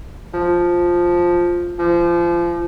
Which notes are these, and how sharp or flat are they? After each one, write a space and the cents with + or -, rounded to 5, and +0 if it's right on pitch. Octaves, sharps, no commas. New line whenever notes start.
F3 +5
F3 -25